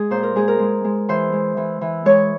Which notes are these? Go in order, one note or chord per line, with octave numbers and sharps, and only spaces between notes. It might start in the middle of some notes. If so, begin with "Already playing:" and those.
Already playing: G#3 G#4
A#2 C5
A#4
G#3 G#4
A#4
G#3
G#3
E3 C5
G#3
E3
E3
G#3 C#5